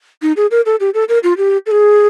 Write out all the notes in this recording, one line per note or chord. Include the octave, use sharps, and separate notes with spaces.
D#4
G#4
A#4
A4
G4
A4
A#4
F4
G4
A4
G#4